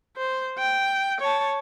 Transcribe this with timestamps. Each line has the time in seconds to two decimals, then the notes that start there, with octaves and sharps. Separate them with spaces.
0.17 C5
0.58 G5
1.20 C#5 A5